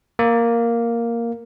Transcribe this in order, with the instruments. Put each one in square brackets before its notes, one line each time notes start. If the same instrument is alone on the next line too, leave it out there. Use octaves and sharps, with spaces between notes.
[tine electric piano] A#3